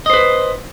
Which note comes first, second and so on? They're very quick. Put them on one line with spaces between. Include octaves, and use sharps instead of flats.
D#5 C5 B4